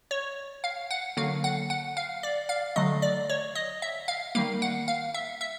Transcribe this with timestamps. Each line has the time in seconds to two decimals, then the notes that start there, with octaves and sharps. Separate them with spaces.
0.11 C#5
0.64 F5
0.91 F#5
1.17 D3 F#3 A#3 F5
1.44 F#5
1.70 F#5
1.97 F5
2.23 D5
2.49 F5
2.76 D3 F#3 A3 D#5
3.02 D5
3.30 C#5
3.55 D#5
3.82 E5
4.08 F5
4.35 D#3 G3 A#3 F5
4.62 F#5
4.88 F5
5.14 E5
5.41 E5